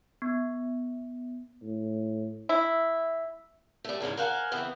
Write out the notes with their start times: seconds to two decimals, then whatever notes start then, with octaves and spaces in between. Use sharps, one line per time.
0.22 B3
1.62 A2
2.49 E4
3.84 G3 A3
4.00 E2 G#2 C#3 G#3
4.17 A#4 C5 F5 F#5 G#5
4.52 C#3 E3 B3 C4